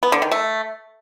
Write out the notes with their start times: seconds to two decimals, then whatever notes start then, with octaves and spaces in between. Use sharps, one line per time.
0.03 B3
0.12 D3
0.22 D#3
0.32 A3